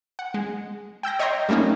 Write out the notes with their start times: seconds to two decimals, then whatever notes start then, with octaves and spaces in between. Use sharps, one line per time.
0.19 F#5
0.34 G#3
1.03 G5 E6 G6 A#6
1.19 C#5 D#5 E5 G5 A#5 C6
1.49 G3 A3 A#3 C#4 D#4